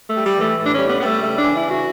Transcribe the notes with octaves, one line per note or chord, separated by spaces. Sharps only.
A3
G3
G3
E3
A3
A2
D4
C#4
G3
B3
G3 B3
A3
C#3 A3
E3 D4
E4
C#3
F#4